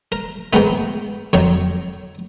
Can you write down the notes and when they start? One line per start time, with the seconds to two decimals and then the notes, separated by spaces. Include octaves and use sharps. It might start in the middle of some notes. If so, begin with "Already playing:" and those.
0.12 A#4
0.53 G#2 D#3 G#3 B3 D#4 B4
1.33 F2 D#3 F#3 C#5